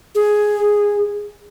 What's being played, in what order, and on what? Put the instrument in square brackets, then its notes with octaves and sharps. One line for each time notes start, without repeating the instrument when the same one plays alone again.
[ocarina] G#4